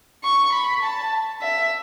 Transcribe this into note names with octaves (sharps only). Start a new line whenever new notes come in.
C#6
B5
A5
E5